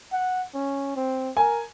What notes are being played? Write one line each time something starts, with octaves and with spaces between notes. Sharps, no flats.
F#5
C#4
C4
A#4 G#5